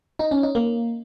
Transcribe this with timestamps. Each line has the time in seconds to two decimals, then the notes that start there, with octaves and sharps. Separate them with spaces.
0.19 D#4
0.31 C#4
0.43 D#4
0.55 A#3